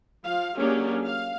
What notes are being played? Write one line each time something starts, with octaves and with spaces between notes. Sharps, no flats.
F3 F5
F#3 A#3 C#4 D4 G4 G#4
F5